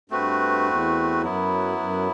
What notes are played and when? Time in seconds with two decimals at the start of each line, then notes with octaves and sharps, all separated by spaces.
0.10 G2 A3 C4 F#4 B4
0.66 E2
1.22 F#2 F#3 B3 E4
1.78 F#2